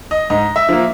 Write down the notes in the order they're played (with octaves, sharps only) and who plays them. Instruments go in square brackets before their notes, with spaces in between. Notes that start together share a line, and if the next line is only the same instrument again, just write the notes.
[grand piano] D#5
G#2 D#5
E5
F3 A#3